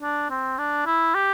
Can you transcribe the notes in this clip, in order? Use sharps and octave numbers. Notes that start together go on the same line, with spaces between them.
D4
C4
D4
E4
G4